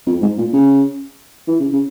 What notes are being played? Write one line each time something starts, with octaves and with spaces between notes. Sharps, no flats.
F2
G#2
A#2
C#3
E3
C#3
C#3